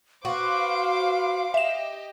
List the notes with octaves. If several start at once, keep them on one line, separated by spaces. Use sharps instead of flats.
F#4 B4 C5 F5 D6
G4 D#5 E5 E7